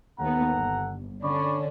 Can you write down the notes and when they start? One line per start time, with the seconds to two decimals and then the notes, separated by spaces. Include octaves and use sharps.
0.20 D#2 B3 A4 F#5 A#5
0.54 G1
1.24 D3 C#4 D4 D5 B5 C#6